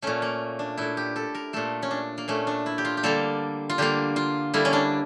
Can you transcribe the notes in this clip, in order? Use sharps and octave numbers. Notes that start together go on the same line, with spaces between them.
A#2 A3 C#4
A#3
D4
A#2 A3 E4
G4
A4
A#4
A#2 A3 A4
C#4
D4
A#3
A#2 A3 C#4
D4
E4
G4
F4
G4
D3 G3 A#3 A4
F4
D3 G3 A#3 G4
F4
D3 G3 A#3 E4
C#4
D4